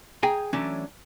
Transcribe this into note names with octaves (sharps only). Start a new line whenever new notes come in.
G#4 G5 G#5 A#5
E3 F#3 A3 C#4 D4